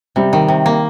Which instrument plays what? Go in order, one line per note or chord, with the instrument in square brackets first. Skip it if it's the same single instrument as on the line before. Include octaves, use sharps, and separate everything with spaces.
[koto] C3 [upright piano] G3
[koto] D#3
C3
A#3